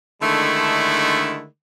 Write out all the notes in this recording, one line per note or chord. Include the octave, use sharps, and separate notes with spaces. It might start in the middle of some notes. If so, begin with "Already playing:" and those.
D3 D#3 G#3 A3 D4 E4